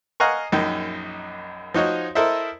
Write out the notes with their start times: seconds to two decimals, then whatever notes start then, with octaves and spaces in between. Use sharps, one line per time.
0.20 D#5 F5 F#5 G#5 A#5 C#6
0.52 A#1 F#2 D#4 G5
1.74 F3 D#4 F#4 C#5 D#5
2.15 E4 A4 A#4 C5 D#5 E5